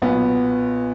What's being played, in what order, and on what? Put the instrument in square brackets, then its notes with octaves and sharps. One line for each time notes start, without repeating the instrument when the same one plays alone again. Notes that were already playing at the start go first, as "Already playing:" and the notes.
[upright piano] B1 A#2 B3